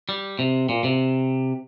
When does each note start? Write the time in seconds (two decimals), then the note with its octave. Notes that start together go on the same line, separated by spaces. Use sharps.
0.09 G3
0.39 C3
0.69 A#2
0.84 C3